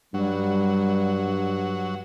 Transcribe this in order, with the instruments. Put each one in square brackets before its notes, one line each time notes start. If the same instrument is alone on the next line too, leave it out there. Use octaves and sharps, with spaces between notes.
[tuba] G2 [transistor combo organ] F#3 [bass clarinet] G3